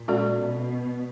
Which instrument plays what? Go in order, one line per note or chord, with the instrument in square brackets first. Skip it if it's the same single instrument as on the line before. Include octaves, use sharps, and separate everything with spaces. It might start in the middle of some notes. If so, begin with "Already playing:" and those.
Already playing: [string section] A#2
[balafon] G#3 C#4 F#4 A4 D5
[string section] B2